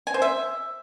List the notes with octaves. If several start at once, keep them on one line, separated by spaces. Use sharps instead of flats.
G#5
C5
E5